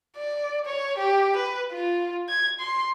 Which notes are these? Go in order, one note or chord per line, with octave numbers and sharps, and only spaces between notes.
D5
C#5
G4
B4
F4
G#6
C6